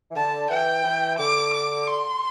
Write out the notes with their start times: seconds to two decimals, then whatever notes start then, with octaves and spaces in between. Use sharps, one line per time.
0.11 E3
0.16 D3 A5
0.50 E3 G5
0.84 E3
1.19 D3 D6
1.54 D6
1.88 C6